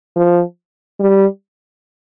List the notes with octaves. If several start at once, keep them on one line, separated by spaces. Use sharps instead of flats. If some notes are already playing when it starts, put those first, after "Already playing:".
F3
G3